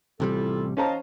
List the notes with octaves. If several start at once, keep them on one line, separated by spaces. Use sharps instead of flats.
A1 C3 G3 E4 F4 A4
C#4 C5 D#5 F5 A5 A#5